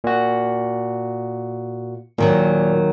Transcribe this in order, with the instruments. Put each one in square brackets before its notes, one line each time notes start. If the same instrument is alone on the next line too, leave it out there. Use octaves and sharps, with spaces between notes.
[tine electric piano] A#2 F#4
[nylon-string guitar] D#2 D#3 F#3 [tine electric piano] A#2